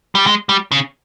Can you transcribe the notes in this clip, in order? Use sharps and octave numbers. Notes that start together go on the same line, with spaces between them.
G3
G#3
G3
C#3